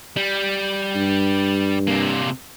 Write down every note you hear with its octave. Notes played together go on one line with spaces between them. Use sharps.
G3
G2
C3 A#3